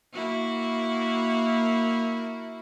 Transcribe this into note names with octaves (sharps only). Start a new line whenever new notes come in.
A#3 E4 F#4